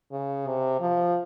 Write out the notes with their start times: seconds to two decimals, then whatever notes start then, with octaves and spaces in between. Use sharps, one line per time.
0.12 C#3
0.47 C3
0.81 F3